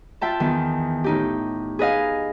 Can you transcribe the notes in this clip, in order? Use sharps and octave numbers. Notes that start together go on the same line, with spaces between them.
F4 E5 G5 A5
E2 D#3
A2 D#4 G4
G#4 B4 D#5 F5